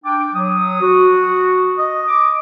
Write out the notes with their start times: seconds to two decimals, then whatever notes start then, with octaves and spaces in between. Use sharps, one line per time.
0.05 D4 G5 D6
0.35 F#3 D#6
0.81 F#4
1.78 D#5
2.08 D6